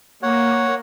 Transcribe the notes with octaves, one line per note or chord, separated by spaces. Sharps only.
A#3 C#5 F#5